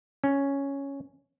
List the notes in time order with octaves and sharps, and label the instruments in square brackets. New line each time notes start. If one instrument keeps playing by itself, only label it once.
[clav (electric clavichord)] C#4